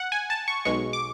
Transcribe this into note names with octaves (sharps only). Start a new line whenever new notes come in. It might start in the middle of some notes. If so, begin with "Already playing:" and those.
Already playing: F#5
G#5
A5
C#6
B1 B2 G#3 C#6
D6